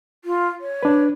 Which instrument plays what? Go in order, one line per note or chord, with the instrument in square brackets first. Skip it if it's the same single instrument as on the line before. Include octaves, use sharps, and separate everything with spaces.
[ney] F4
C#5
[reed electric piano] D4 B4